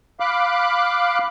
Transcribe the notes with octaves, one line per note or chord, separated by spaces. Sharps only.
F5 B5 D6 F#6